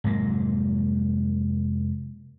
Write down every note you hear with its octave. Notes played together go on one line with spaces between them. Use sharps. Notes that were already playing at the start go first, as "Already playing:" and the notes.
F1 G#2 F#3 A#3